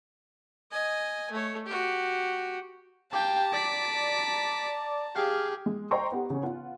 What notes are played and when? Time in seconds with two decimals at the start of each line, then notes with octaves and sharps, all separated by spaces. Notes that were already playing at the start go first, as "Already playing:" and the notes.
0.71 D#5 G#5
1.31 A3 C#5
1.66 F#4 G4
3.12 G4 F5 G5 A5 A#5
3.53 D5 B6 D7
5.15 G4 G#4 F5
5.66 G#3
5.91 C5 D#5 G5 A#5 C6 C#6
6.12 B3 G4
6.30 C#3 C#4
6.43 B3 F4 F#5